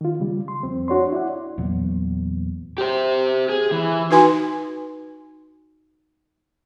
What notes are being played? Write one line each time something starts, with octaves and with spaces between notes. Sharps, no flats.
D#3 F4
C#3 G3
C6
F2 C4
D4 F#4 C#5 C6
E4 D5 F#5
E2 A#2 F#3 B3
G4 C5
G#4
E3
D#4 F#4 B4 G#5 C6